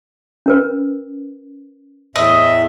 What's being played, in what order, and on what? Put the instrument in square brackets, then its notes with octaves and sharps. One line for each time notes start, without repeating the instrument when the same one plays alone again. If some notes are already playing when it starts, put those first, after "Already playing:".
[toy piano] C#4 A#4 B4
[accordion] E2 A2 E5 [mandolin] D#5